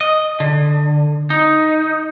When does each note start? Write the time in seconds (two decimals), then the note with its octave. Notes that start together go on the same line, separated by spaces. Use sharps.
0.01 D#5
0.40 D3
1.30 D#4